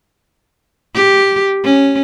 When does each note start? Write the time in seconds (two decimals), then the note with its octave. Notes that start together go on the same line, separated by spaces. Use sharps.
0.95 G4
1.64 C#4